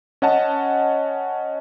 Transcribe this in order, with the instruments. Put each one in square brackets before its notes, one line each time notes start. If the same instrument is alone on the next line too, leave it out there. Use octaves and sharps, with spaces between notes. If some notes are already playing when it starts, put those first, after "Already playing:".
[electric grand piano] C#4 D#5 F#5 A5